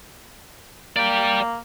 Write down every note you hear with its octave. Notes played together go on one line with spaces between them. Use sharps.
A#3 D5 G5